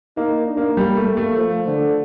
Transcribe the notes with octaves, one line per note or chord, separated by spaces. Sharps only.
A#3 D#4
D4
A#3
G3 A#3
A3
A3
F3
D3